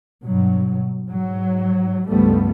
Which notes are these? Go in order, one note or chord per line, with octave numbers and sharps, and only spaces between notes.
G2 B2 F#3
G#2 F#3
C#2 G2 F3 G3 A3 B3